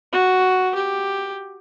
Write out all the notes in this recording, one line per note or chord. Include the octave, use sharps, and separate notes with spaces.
F#4
G4